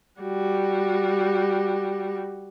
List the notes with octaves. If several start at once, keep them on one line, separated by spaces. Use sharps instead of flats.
G3 F#4